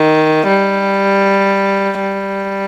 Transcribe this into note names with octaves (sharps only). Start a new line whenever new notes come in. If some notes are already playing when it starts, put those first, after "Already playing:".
Already playing: D#3
G3
G3